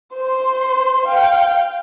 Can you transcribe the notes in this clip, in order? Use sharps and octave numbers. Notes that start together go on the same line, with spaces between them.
C5 C6
F5 G5